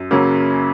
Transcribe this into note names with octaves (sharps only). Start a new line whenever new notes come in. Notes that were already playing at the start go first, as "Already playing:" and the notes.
Already playing: F#2
C#3 F#3 A#3 C#4